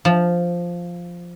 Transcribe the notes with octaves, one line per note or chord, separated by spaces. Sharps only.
F3